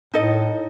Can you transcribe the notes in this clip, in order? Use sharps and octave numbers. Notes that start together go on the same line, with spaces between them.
A2 D#4 A4 D#5